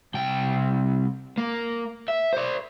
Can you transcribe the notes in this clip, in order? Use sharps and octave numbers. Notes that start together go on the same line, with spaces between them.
C2 G5
A#3
E5
C5 D5